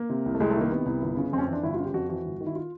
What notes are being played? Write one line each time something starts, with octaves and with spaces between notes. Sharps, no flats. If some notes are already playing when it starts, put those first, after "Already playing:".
Already playing: A#3
C3
C2
A3
C2 G#3
A3
D#3 A#3
C3 B3
C2
G1
C#3
F2 C4
C#4
C4
E3 D4
G1 E4
F4
C#3
G4
F2 F#4
E3 F#4
G1
D#3
E4
F4